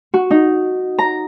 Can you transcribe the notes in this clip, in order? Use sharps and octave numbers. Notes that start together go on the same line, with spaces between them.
F#4
D#4
A#5